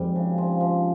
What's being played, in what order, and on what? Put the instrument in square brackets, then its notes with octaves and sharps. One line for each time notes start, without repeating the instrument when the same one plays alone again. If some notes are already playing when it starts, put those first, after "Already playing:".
Already playing: [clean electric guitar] F2 [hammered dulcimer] G#2 G3
[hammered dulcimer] C#3
F3
F3